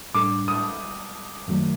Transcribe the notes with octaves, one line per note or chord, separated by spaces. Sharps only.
A2 G3 D4 A4 D6
D#6
F#2 D#3 F#3 A3